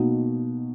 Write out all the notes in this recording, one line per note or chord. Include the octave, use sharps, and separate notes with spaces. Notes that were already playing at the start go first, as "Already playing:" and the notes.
Already playing: B2 A#3 D#4 F#4